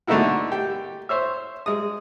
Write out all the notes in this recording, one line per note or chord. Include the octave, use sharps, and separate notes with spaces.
D3 A3 A#3 D#4 E4 F#4
G4
C5 C#5 E5
G#3 D#6